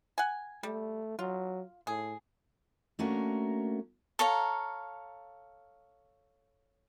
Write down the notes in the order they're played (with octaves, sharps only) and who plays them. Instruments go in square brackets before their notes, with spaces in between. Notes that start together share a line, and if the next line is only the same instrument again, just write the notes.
[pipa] F#5 G#5
[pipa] G3 [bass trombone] A3
[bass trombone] F#3 [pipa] F4
[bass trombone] A2 [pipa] G#4
[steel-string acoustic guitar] A3 A#3 C#4 D4 F#4 A#4
[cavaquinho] A4 C#5 F5 A#5